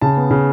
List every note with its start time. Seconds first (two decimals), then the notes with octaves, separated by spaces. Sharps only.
0.01 C#3 A5
0.17 B3
0.31 C#3